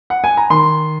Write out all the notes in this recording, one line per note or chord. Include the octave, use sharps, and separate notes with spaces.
F#5
G#5
A#5
D#3 C6